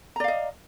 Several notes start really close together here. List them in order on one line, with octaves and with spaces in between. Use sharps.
A#5 D5 F5 D#5